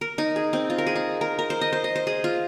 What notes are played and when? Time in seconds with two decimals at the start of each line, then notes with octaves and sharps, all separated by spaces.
0.01 A#4
0.18 D#4
0.36 G#4
0.53 C4
0.70 F4
0.78 A#4
0.86 G#4
0.95 D#4
1.21 A#4
1.39 A#4
1.50 C5
1.61 D#5
1.73 C5
1.84 D#5
1.96 C5
2.07 G#4
2.24 F4